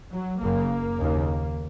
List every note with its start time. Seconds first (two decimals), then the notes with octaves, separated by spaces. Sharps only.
0.13 F#3
0.41 F#1 F#2 C#3 A#3
0.98 D#2 C#3